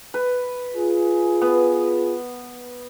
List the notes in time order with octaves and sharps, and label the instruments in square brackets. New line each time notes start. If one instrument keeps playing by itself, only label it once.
[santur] B4
[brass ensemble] F4 G#4
[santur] B3